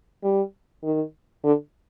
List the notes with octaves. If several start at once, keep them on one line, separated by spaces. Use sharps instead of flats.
G3
D#3
D3